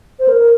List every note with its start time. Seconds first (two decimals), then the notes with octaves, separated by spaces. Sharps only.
0.19 C5
0.28 A#4